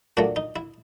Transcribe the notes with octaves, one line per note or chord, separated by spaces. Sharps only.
A#2 F#3 A3 D4
D#4
E4